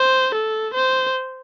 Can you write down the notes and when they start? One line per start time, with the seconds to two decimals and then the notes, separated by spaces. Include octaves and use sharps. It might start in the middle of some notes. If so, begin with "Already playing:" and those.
Already playing: C5
0.34 A4
0.74 C5